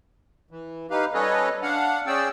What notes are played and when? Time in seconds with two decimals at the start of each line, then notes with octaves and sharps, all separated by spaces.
0.51 E3
0.91 D#4 G4 B4 F5
1.14 G3 C#4 A4 B4 C#5 D#5
1.62 D4 F5 F#5
2.07 C#4 G#4 D5 G5 E6